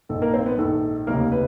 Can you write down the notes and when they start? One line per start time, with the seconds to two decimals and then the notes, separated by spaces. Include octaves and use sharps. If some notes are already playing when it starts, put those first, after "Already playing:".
0.09 A#1 G#2 D#3 A4
0.22 A#3 A#4
0.34 C4 C5
0.46 B3 B4
0.58 A#1 G#2 D#3 A4
1.07 F1 D#2 C#3 A#3 A#4
1.32 B4